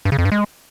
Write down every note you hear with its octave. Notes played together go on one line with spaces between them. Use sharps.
G2
C#3
F2
G2
G#3